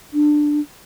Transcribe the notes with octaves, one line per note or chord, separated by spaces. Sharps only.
D4